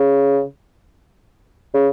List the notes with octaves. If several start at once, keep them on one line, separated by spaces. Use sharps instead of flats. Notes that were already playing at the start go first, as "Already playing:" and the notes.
Already playing: C#3
C#3